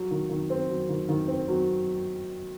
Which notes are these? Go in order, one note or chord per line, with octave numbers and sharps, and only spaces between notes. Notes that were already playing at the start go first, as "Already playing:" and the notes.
Already playing: F#3
D#3
D#3
C4
F#3
D#3
D#3
C4
F#3